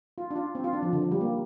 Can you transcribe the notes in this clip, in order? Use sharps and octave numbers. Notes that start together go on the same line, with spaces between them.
F4
D4
F4
C4
F4
D4
F3
D3
F3
G3
A#3